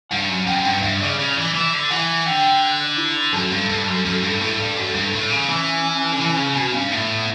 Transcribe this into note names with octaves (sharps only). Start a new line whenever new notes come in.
G2 F#5
F#2
F#2 G5
G5
G2 F#5
G2 E5
C#3 D5
C#3 C#5
E3 D5
E3 E5
D3
E3 F#5
D3 G5
F#5
D5
E4
F#2 A4
G2
G2
F#2
F#2
G2
A2
G2
F#2
G2
A2
C#3
E3 C#4
D3
E3
C#3
B2
G2
A2 B3